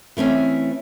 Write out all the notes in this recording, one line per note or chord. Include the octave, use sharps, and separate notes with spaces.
E3 A3 C4 C#4